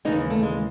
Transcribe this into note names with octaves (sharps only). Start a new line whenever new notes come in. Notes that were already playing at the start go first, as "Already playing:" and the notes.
D#2 C#3 E3 G#3 D#4
A3
G#3